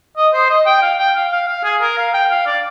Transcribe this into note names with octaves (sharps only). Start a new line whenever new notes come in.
D#5
C5
D#5
G5
F5
G5
F5
F5
F5
G#4
A#4
F5
G5
F5
D5